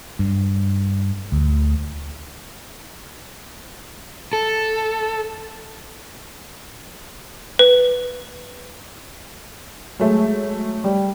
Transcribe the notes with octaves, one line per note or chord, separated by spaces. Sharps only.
G2
D2
A4
B4
F#3 G#3 A3
G3